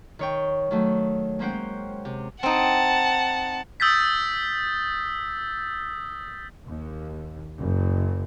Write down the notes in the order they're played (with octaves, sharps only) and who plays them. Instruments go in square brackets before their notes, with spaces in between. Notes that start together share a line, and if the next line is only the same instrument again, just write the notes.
[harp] D#3 C#5 G5
D#3 F#3 A3
G#3 A#3 C#4 C5 F#5 G5
C3
[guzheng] C4 D#4 [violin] F#5 A5
[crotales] D#6 E6 G6 A6 B6
[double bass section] D#2
F#1